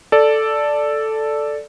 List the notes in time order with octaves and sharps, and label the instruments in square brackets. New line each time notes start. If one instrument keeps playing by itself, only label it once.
[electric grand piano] A4 D5